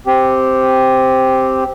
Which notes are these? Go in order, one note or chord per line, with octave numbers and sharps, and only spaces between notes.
C4 G4